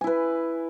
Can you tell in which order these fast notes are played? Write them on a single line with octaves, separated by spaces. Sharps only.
G#5 E4 B4